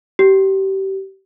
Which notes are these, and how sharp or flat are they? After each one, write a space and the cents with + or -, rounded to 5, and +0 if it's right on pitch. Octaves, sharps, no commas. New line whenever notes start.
G4 -25